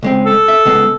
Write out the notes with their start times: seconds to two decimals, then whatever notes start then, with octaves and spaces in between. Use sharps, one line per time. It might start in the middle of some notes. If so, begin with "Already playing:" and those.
0.03 C#2 G#3 C4
0.26 A4
0.48 E5
0.65 C#2 G#3 B3